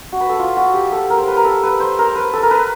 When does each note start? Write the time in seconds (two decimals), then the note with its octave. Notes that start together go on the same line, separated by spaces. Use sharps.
0.13 F#4
0.21 B4
0.29 A4
0.39 F4
0.57 F#4
0.74 G4
0.92 A4
1.10 A#4
1.18 C5
1.28 B4
1.37 A#4
1.45 A4
1.63 B4
1.80 C5
1.99 A#4
2.16 B4
2.33 A4
2.43 A#4
2.51 B4